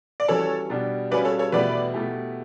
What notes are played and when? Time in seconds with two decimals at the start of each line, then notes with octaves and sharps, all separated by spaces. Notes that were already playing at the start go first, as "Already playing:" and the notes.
0.20 D5
0.28 E3 G3 C#4 F#4 A4 C#5
0.70 B2 G3 D4 G4
1.11 C#3 G3 C#4 F#4 B4 D5
1.25 A4 C#5
1.39 A4 C#5
1.52 E2 B2 A3 E4 G4 B4 D5
1.94 B2 A3 E4 G4